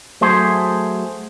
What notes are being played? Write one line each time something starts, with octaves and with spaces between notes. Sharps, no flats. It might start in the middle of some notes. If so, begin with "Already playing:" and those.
F#3 A3 G#4 C5